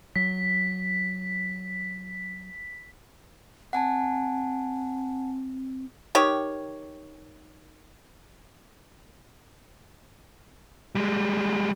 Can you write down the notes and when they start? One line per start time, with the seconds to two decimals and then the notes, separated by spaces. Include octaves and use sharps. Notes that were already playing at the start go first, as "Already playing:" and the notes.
0.16 F#3 B6
3.73 C4 F#5 G#5 A5
6.15 D#3 G4 C#5
10.95 G3 G#3